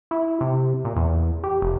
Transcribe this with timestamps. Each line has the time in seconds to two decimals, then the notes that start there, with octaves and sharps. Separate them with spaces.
0.11 E4
0.41 C3
0.85 A#2
0.96 E2
1.44 G4
1.62 F1